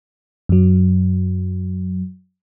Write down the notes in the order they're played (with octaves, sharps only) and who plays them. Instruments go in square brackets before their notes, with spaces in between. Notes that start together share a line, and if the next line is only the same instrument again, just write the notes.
[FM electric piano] F#2 F#3